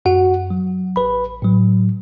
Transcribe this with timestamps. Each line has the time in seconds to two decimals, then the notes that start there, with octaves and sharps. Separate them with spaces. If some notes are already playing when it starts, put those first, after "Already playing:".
0.05 F#2 F#4 F#5
0.50 F#3
0.96 A1 B4 B5
1.42 A2 F#3